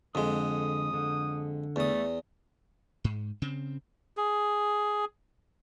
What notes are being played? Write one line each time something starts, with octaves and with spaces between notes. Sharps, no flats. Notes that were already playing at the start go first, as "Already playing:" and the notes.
F2 D3 G#3 D#6
D3
E2 A3 D#6
G#2
C#3 C4
G#4